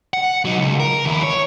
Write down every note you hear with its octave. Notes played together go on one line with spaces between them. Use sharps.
F#5
F#3 D#4
C#2
A#4
D#2 E4
C#5